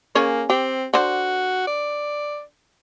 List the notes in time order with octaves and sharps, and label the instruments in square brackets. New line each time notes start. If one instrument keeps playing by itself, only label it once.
[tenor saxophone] A#3 [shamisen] C#4 G#4 C#5
[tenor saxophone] C4 [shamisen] G4
[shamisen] D3 C5 [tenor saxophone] F#4
[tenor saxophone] D5